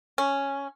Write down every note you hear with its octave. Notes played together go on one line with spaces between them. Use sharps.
C#4